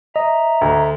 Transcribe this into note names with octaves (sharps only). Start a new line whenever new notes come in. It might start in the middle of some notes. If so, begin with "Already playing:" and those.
D#5 E5 A#5
D2